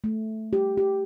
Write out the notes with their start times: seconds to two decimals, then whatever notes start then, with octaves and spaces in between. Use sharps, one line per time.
0.04 A3
0.53 G4
0.78 G4